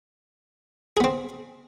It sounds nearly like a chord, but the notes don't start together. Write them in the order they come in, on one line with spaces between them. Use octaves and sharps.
G#4 B3 C4